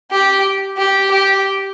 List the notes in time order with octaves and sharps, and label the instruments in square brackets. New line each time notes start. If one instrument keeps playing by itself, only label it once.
[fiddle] G4
G4
G4